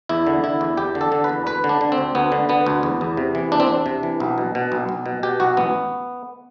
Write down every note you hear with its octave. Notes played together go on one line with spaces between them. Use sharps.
E2 E4
D3
D3 E4
E2
E2 G4
D3
A4
D3
B4
E2
D2 B4
D3
D4
D3
C4
D2
D2 B3
D3
D3 B3
D2
E2
E2
C3
E3
E2 D4
C4
E2 D4
C3
E3
B1
B2
B2
B1
B1
B2
B2 G4
B1 F#4
A1 B3